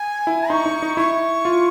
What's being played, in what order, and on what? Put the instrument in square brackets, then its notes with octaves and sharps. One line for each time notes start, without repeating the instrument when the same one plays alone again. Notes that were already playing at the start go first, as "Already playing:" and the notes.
Already playing: [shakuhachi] G#5
[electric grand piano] E4
[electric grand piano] D#4 [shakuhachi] C#6
[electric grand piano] D#4
D#4
[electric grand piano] E4 [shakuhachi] C#6
[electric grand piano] F4